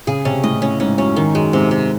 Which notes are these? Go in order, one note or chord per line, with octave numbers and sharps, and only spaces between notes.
C#3 G#4
C3 C#4
A2 D#5
A2 C#4
G#2 C#4
F#2 C#4
G#2 D#3
F#2 G#3
G#2 C3
C3